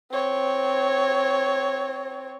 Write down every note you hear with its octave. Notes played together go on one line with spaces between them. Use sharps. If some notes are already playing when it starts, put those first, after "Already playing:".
C4 C#5